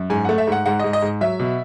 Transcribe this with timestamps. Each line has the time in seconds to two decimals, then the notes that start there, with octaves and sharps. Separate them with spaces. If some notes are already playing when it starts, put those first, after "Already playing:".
Already playing: F#2
0.10 G#2 G#5
0.25 A3 F#5
0.38 E5
0.47 G#2 F#5
0.66 G#2 F#5
0.79 G#2 D#5
0.93 D#5
1.02 G#2
1.21 F#3 E5
1.39 B2